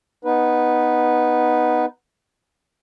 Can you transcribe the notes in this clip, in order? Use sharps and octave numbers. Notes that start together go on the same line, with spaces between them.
B3 D#4 B4